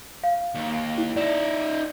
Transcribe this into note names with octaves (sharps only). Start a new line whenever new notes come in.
F5
D#2
E4
D#4 D5 E5